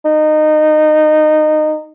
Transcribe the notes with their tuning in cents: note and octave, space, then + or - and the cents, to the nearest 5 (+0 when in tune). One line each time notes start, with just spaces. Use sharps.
D#4 -20